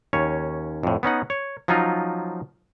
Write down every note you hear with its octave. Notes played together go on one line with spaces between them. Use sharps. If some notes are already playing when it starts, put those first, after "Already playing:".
D#2 C#4 C#5
F2 A2
B3 C#4 D#4 F#5
C#5
F3 F#3 C#4 D#4 F4